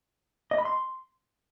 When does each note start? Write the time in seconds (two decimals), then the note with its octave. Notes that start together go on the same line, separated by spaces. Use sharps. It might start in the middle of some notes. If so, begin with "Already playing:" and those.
0.51 D#5
0.58 B5
0.65 C6